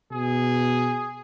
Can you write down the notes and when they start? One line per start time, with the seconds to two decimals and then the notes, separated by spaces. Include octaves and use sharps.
0.12 B2 G#4